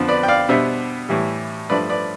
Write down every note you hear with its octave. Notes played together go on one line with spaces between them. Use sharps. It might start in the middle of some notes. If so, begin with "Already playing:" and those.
Already playing: F2 D3 F3 B3
B4 D5
G5
D5 F5
B2 G3 B3 D4 C5 E5
A2 E3 G3
G2 F3 A3 B4 D5
B4 D5